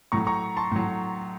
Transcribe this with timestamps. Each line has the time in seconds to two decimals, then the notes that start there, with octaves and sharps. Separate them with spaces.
0.12 A2 F#3 A#5 C#6
0.27 A#5 C#6
0.57 A5 C6
0.71 A2 F#3